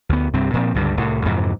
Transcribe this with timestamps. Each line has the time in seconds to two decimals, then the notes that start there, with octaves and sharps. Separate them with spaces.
0.09 D2 B3
0.34 C2 G2 C4
0.54 A#2 F3 C4
0.74 C#2 G2 D3 G3
0.97 C2 A2
1.25 F2 G#2 C3 E3